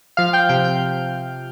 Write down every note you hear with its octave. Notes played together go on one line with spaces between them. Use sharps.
F3 F5 F6
G5 G6
C3 G5 G6
G5 G6